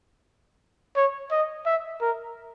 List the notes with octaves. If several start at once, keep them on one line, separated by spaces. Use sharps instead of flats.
C#5
D#5
E5
A#4